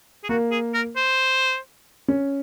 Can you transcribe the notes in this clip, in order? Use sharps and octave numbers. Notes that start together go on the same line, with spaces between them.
G#4
A#3 F#4
G#4
A#4
C5
C#4